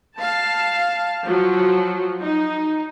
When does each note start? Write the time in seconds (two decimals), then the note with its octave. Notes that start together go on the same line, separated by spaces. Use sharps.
0.18 F5 A5
1.25 F3 F#3
2.21 D#4